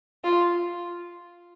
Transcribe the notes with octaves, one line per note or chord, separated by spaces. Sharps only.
F4